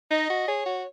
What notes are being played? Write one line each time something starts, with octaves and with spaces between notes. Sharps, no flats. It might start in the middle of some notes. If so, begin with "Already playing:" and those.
D#4 D#5
F#4
G#4 C#5
F#4